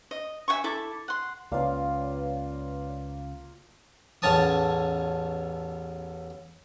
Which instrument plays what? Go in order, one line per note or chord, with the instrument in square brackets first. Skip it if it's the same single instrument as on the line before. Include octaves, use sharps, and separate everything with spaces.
[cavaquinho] D#5
E5 F#5 G#5 C#6
E4 A4 D6
F#5 C6
[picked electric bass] C#2 C#3 [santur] A#3 F4 [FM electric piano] B4 C#5 D5 [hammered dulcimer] F5
[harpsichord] A1 E2 C#4 C#5 A5 D#6